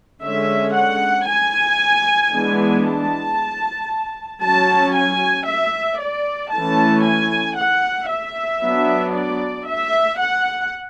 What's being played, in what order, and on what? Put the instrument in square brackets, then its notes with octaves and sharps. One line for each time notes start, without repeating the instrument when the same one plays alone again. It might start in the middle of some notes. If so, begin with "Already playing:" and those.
[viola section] D3 G#3 C#4 E5
F#5
G#5
E3 G#3 B3 D4
A5
F#3 C#4 A5
G#5
E5
D5
E3 A3 C#4 A5
G#5
F#5
E5
F#3 B3 D4
D5
E5
F#5